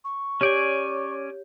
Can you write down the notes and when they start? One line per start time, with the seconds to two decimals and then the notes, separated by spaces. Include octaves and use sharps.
0.04 C#6
0.41 C#4 G4 C#5 D5 G#5 G6